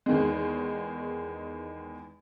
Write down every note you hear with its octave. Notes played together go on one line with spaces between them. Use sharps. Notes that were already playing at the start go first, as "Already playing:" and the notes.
E2 D#3 G#3